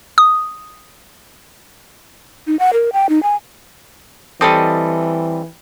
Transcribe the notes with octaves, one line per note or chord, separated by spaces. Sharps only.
D#6
D#4
F#5
A#4
G5
D#4
G#5
E3 G3 C4 A4 D#5 D#6